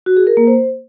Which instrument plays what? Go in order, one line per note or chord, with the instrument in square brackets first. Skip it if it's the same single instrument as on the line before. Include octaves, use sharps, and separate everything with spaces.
[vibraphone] F#4
G#4
A#4
A#3
C5